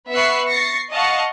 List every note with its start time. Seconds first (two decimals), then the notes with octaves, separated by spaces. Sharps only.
0.12 B3 B4 E5 C#6 F#6 C7
0.50 C#6 A6 A#6 C7 C#7
0.92 D#5 F5 F#5 A5 C#6